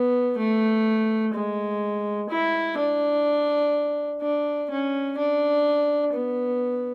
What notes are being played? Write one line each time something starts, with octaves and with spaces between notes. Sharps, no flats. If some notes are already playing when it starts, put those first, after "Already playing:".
Already playing: B3
A3
G#3
E4
D4
D4
C#4
D4
B3